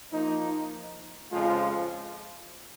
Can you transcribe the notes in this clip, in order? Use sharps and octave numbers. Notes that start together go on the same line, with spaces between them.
F3 A#3 D#4
F2 C#3 F3 G#3 F4